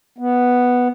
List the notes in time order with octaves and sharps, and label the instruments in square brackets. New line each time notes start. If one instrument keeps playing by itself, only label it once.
[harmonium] B3